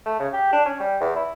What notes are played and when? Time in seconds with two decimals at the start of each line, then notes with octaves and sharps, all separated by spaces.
0.06 A3
0.19 C#3
0.33 G4
0.53 D4
0.66 C#4
0.80 G3
1.01 E2
1.16 E4